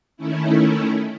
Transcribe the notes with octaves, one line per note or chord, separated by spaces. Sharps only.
D#3 A3 C#4 E4